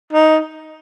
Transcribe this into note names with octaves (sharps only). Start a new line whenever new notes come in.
D#4